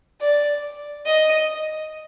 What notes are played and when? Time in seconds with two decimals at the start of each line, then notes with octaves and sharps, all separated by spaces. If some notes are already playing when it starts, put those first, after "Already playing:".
0.20 D5
1.06 D#5